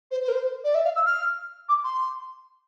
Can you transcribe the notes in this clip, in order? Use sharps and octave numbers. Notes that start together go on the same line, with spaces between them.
C5
C5
A#4
C5
D5
E5
F5
E6
F6
D6
C6